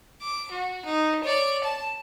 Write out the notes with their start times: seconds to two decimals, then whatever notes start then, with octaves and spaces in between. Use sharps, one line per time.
0.21 D6
0.51 F#4
0.84 D#4
1.23 C#5 D5
1.64 A5